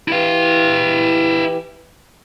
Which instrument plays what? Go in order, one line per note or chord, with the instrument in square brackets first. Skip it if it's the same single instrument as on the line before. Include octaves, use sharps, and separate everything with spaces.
[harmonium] E3 G4 [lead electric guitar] E4 F5